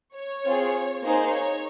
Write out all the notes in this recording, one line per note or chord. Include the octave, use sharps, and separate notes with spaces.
C#5
C4 F4 G#4
A#3 D#4 G#4 C5
C#5